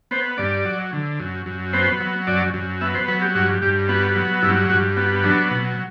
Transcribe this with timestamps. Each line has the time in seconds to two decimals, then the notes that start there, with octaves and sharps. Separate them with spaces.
0.11 B3 C5
0.38 G2 D5
0.65 F#3
0.93 D3
1.19 F#2
1.46 F#2
1.73 B3 C5
2.00 F#3
2.27 F#2 D5
2.54 F#2
2.81 B3 E5
2.95 C5
3.08 F#3 B4
3.22 G4
3.35 G2 F#4
3.62 G2 G4
3.89 B3 F#4
4.16 F#3
4.42 G2 E4
4.70 G2 F#4
4.97 B3 F#4
5.23 F#3 D4
5.51 B2